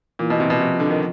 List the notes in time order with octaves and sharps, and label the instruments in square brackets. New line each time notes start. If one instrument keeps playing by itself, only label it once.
[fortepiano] A#2 [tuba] E3
[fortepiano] B2
C3
B2
[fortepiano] C3 [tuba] F3
[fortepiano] D3
D#3